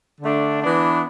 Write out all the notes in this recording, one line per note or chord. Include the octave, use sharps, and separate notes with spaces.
D3 A3 D4
E3 B3 D4